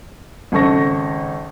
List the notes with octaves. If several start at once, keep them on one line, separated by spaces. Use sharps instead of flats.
G#1 C#3 A4 C#6 A#6